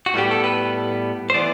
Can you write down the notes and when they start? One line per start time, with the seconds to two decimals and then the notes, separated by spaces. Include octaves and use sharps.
0.06 F#4
0.14 A2 G3 B3 G4
0.31 A4
0.44 B4
1.30 C5
1.34 E3 B3 D5